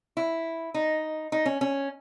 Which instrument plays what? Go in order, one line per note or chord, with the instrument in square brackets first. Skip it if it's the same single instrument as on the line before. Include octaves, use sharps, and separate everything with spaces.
[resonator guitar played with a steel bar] E4
D#4
D#4
C#4
C#4